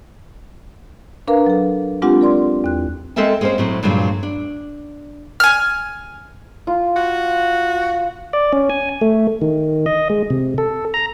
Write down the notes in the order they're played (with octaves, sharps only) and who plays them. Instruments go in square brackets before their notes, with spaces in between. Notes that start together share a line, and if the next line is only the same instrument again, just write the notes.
[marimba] D4 A#4 B4 F5 A#5
F#3 A4
G#3 C4 D4 F4 G4 F#5
A#4 D5 C6
E2 F#6
[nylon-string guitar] G#3 C4 A4 A#4 E5 G#5
G#3 A#3 C4 C#4 C5
A2 F#3 C4
D2 G2 A#2 F#3 G#3
D4
[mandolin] G#5 F6
[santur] F4
[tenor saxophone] F#4
[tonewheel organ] D5
C#4
G#5
A3
D#3
D#5
G#3
C3
A4
A#5